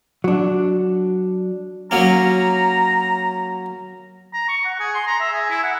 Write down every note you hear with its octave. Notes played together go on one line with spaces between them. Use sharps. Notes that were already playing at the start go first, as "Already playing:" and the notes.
F#3 D4
F#3 A#3 C#4 A#5
A#5
C#6
F#5
G#4
C6
A#5
E5
G#4
E4
F#5